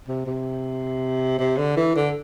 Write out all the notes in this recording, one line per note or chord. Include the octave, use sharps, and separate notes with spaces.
C3
C3
C3
D3
E3
D3